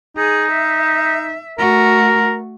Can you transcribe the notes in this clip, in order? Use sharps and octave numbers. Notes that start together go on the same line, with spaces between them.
D#4 G#4
E5
A3 F#4 A#4